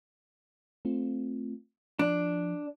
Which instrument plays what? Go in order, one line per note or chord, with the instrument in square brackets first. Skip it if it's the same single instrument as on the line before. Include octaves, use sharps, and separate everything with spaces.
[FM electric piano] A3 C4 F4
[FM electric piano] F3 [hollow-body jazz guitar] D4